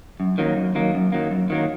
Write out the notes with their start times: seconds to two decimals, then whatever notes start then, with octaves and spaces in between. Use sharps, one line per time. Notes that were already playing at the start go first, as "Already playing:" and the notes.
0.20 F#2
0.38 D#3 F#3 A#3
0.56 F#2
0.75 D#3 F#3 A#3
0.94 F#2
1.12 D#3 F#3 A#3
1.31 F#2
1.50 D#3 F#3 A#3